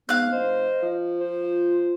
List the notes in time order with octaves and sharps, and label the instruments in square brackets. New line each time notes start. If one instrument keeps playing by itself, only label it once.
[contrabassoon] G#2 [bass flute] B3 [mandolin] F5 F#6
[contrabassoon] F#1 [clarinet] C5 [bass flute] D#5
[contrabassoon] F3
[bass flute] F4 [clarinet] C5